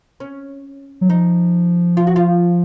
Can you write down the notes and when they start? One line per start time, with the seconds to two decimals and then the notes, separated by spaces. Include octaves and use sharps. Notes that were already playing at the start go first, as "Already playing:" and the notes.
0.20 C#4
1.01 F#3
1.09 F3 D#4
1.97 F4
2.07 F#4
2.16 F4